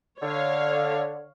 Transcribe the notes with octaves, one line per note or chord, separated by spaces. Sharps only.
D3 C#5 F5